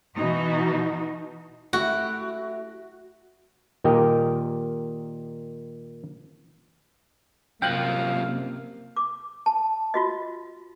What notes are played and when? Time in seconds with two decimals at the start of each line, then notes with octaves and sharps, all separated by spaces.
0.16 B2 E3 D#4 F#4
1.73 A3 E4 F#4 G4
3.84 A#2 D#3 G4 A#4 D#5 G5
7.62 F#2 C3 F3 A#3 F5 G5 F#6
8.96 D6
9.46 A5
9.94 F4 F#4 D#5